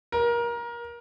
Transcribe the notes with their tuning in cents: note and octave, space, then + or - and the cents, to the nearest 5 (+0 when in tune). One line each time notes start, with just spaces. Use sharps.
A#4 +25